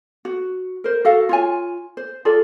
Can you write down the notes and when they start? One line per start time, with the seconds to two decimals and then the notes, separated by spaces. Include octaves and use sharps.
0.25 F#4
0.84 A#4 C5
1.05 F#4 A4 F5
1.29 F4 C#5 G#5
1.97 C5
2.25 F4 G#4 A4 D5